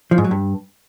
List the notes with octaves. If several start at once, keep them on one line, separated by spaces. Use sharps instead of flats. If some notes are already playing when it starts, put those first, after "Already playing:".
F3
G#2
F#3
G2